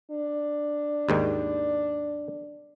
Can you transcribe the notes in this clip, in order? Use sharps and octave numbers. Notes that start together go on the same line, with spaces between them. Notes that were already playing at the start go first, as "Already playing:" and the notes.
D4
D#2 G#2 D#3